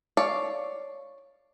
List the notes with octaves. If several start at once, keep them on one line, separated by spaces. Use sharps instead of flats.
C#5 D5 F5